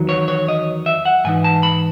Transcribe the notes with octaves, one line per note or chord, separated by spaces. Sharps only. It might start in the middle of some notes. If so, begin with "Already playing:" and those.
Already playing: E2 D#3 F#3
C#5
C#5
D#5
E5
F#5
G#2 E3 D#4 G#5
A5
B5